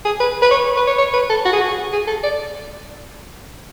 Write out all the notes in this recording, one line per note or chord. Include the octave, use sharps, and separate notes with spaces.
G#4
B4
B4
C#5
B4
C#5
C#5
B4
A4
F#4
G#4
F#4
G#4
A4
D5